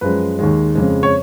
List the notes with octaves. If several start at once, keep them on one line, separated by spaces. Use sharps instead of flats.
F#2 F3 G#3 B4
D#2 D#3 G#3
F2 C#3 G#3
C#5